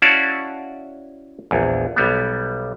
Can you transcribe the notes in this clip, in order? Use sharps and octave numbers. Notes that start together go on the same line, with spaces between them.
C#4 E4 F#4 D5 F5 A5
A#1 E2
B1 G3 B3